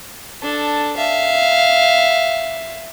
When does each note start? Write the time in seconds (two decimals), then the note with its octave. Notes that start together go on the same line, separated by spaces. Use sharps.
0.42 D4 A4
0.97 E5 F5